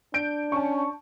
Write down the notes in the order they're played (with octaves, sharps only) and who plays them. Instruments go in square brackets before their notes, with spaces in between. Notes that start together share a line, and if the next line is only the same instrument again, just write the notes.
[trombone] D4 [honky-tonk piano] G6 D7
[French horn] C#4 [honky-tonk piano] A5 C#6